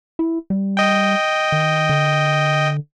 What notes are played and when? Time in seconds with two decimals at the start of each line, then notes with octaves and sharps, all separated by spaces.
0.19 E4
0.50 G3
0.77 D#5 G5
1.52 D#3
1.89 D3